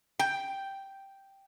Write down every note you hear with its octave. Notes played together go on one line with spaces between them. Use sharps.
G5